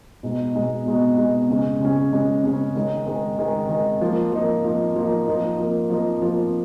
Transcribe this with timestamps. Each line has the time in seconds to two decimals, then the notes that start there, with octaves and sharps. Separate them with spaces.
0.23 B2 G#3 D#4
0.54 B2 G#3 D#4
0.86 B2 G#3 D#4
1.18 B2 G#3 D#4
1.49 C#3 G#3 C#4
1.80 C#3 G#3 C#4
2.12 C#3 G#3 C#4
2.43 C#3 G#3 C#4
2.75 D#3 G#3 D#4
3.06 D#3 G#3 D#4
3.39 D#3 G#3 D#4
3.69 D#3 G#3 D#4
4.01 F3 A#3 D#4
4.32 F3 A#3 D#4
4.64 F3 A#3 D#4
4.96 F3 A#3 D#4
5.28 F3 A#3 D#4
5.59 F3 A#3 D#4
5.90 F3 A#3 D#4
6.22 F3 A#3 D#4